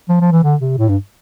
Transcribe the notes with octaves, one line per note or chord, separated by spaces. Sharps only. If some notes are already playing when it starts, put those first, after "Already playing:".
F3
F3
E3
D3
C3
A2
G2